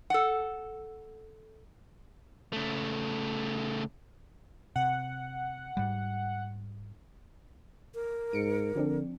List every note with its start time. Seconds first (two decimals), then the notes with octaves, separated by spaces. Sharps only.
0.10 A4 F#5
2.53 C#3 A3
4.76 C3 F#5
5.77 G#2 G3
7.95 A#4
8.33 G#2 C#7 D7
8.75 D3 F3 C4 D4